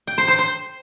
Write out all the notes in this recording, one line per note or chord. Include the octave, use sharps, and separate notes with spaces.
G5
C5
C5
C5